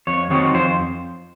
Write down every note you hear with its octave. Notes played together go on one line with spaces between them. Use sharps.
F2 C#5
D#3 F#3 C4 D#4 C#5
F2 C5